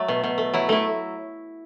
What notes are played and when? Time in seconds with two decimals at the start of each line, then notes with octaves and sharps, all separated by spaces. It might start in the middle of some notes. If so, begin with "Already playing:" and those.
Already playing: F#3 A3
0.08 B2
0.24 B2
0.38 A3
0.53 F#3 E4
0.69 A3 E4